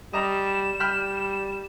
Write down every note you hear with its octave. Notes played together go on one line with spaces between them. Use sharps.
G3 D#5 A#5 E7
G3 G5 B5 F6